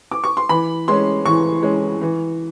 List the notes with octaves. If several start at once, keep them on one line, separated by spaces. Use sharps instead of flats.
D6
C#6
C6
E3 B5
G#3 C#4 C6
E3 C#6
G#3 C#4
E3